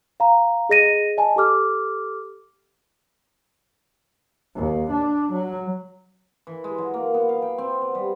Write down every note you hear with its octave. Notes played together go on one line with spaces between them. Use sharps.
F5 A#5
G#4 D#5 A#6 D#7
D#5 G#5 A5
G4 A4 D6 F6
D#2
D4
F#3
E3
G#3
F#3
A#3
B3
F5
G5
C4
B3
G3